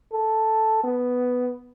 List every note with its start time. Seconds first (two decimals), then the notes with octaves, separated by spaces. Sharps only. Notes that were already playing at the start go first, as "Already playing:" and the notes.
0.13 A4
0.84 B3